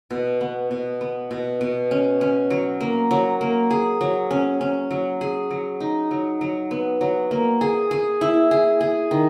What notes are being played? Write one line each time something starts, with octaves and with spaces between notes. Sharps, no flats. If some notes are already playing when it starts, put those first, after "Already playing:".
B2
B3
B2
B3
B2
B2
C#4
C#4
F#3
A#3
F#3
A#3
G#4
F#3
C#4
C#4
F#3
G#4
F#3
D#4
F#3
F#3
B3
F#3
A#3
G#4
G#4
E4
G#4
G#4
D#3